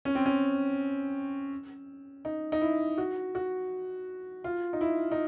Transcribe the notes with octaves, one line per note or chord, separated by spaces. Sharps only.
C#4
C4
C#4
D#4
D#4
E4
F#4
F#4
F4
D#4
E4
D#4